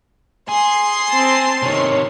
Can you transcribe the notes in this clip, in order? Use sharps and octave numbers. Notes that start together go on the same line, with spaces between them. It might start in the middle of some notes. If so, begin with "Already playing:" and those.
G#4 C6 C7
C4 A5
C3 D#3 C#5